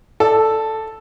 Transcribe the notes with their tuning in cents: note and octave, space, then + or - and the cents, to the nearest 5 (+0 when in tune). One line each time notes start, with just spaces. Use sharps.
A4 +0 D5 +10